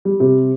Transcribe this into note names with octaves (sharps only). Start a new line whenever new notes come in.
G3
C3